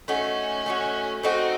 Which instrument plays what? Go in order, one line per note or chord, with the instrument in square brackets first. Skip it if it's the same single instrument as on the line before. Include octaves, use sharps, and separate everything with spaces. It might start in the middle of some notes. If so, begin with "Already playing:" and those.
[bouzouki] A3 D#4 F#4 [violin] C#4
[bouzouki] A3 D#4 F#4
[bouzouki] A3 D#4 F#4 [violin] C4